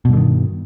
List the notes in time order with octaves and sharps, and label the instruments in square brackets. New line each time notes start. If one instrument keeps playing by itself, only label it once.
[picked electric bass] B2
G2
D3
D#3